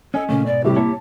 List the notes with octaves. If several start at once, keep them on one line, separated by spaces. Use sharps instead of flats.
C#4 A4 D#5 G#5
A#2 C#3 A3 C#4
G#2 B2 D5
A2 C3 G3 G4
A#3 E4 C#5 A5